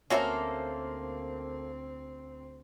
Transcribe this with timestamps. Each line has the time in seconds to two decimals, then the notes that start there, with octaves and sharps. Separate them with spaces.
0.10 D2 A#3 C4 C#4 F#4 A4 C5 E5